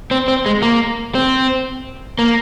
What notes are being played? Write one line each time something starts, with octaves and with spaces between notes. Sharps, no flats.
C4
C4
G#3
A#3
C4
A#3